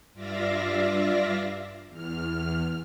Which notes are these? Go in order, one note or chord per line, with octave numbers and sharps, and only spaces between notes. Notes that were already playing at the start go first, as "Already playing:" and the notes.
G2 F4 D5 E5 F5 A#6
E2 F6